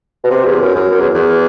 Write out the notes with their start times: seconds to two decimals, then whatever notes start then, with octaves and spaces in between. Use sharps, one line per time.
0.24 B2
0.31 C3
0.45 E2
0.61 F#2
0.76 F#2
0.92 F#2
0.99 E2
1.15 E2